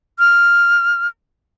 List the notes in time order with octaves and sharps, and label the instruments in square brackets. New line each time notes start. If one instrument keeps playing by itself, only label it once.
[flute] F6